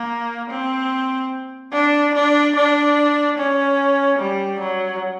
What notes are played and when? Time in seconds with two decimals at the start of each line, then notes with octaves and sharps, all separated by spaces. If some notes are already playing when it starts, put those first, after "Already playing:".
Already playing: A#3
0.50 C4
1.73 D4
2.15 D4
2.56 D4
3.38 C#4
4.19 G3
4.60 F#3